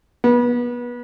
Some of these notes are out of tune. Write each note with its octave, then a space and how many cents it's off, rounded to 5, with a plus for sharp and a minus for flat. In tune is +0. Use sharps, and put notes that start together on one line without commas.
B3 -30